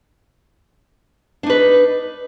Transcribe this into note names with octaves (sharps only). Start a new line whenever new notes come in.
D4 D#4 B4